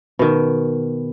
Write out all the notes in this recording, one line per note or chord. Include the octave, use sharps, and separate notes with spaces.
B2 D#3